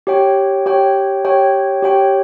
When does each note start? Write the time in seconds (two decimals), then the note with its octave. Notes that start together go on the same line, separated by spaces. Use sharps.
0.07 G4 C#5 G5
0.66 G4 C#5 G5
1.25 G4 C#5 G5
1.82 G4 C#5 G5